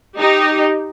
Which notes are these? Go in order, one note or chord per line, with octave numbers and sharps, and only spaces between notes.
D#4 G4